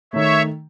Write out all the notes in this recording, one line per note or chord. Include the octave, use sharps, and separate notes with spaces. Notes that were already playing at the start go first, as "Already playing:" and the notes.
D#3 A3 C#5 E5